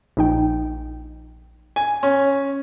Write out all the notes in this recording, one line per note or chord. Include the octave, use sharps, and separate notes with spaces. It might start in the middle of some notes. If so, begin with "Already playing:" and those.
A#1 D#4 G5
G#5
C#4